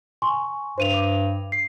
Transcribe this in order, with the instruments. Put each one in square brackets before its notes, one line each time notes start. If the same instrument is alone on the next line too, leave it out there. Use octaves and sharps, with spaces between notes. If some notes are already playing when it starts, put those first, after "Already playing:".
[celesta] G#5 C6 C#6
[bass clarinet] G2 [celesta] C5 D#7 F7
[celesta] D6
C7